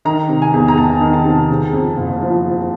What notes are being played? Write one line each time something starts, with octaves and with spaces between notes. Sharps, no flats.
D#3 A#5
C3
G#5
E2
A#5
E2 A5
D#3
A5
C3
C#3
F2
F#1
F3